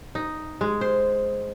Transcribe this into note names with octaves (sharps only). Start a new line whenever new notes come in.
D#4
G#3
C5